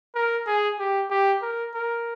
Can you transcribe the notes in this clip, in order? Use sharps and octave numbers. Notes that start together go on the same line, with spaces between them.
A#4
G#4
G4
G4
A#4
A#4